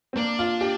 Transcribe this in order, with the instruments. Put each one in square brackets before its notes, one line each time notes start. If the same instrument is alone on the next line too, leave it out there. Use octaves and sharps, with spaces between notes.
[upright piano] C4
[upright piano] A#3 [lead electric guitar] D4
[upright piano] F4
G4